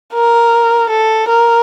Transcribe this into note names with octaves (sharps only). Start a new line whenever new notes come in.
A#4
A4
A#4